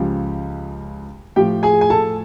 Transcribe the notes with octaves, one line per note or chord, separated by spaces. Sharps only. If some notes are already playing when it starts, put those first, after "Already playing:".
Already playing: C#2 C#3 F3 G4
A2 F3 G4 G5
G#4 G#5
G#5
A4 A5